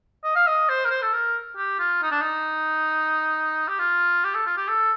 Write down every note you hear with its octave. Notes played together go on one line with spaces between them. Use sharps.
D#5
F5
D#5
C5
A#4
C5
A4
A#4
G4
F4
D#4
D4
D#4
G4
F4
G4
A4
F4
G4
A4